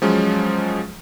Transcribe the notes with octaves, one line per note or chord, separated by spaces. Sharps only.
F3 F#3 G#3 C#4